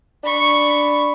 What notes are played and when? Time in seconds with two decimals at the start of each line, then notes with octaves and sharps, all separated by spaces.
0.24 D4 B5 C#6